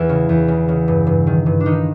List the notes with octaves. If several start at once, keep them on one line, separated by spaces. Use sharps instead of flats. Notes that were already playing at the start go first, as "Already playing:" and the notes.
Already playing: E2 E3 E4
C#3
E2
C#3
C#3
G2
G2
D#3
G2
D4
D#3 D#4